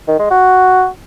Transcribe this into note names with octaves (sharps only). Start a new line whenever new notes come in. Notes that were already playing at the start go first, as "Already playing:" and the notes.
D#3
G#3
F#4